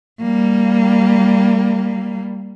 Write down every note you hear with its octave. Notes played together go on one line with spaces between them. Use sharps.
G3 A#3